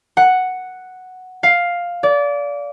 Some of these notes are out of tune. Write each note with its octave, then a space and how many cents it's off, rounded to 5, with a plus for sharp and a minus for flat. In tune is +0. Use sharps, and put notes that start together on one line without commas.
F#5 +0
F5 +5
D5 -25